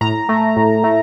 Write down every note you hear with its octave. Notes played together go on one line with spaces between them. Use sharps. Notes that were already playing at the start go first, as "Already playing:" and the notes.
A2 A#5
A3
A2
A3